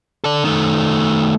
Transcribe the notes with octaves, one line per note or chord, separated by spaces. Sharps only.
A4 D5
D#3 A3